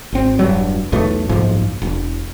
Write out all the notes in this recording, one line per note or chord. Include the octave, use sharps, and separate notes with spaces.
G#1 C4
E1 G2 F#3
B1 E2 B2 A3
F#1 B1 G#2 F3
E1